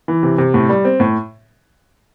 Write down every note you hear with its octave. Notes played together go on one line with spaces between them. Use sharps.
E3
C3
C3
A2
G3
C4
A2